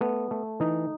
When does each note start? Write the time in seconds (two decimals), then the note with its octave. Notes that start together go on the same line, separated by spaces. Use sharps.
0.01 A3 B3
0.31 A3
0.60 E3 D#4